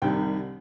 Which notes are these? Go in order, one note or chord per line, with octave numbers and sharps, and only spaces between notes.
C2 C3 D#3 G3 G5